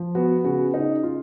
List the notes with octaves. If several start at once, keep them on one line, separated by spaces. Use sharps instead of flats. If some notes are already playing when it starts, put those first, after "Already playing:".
Already playing: F3
B3 F#4
C#3 F#4
C#3 D#4
F4